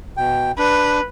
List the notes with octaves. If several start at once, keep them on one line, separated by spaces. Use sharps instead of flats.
B2 G5
D4 B4